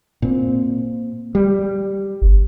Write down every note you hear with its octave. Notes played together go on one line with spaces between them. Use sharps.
A#2 C4
G3
G1